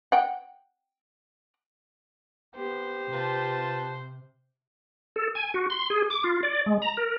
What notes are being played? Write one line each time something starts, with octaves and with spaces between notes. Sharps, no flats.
F#5 G5
B3 G4 C5
C3 F4 B4 A5
A4
G#5
F#4
C6
G#4
D6
F4
D5
G#3
A#5
A#4